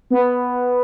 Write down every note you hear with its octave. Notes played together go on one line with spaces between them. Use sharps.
B3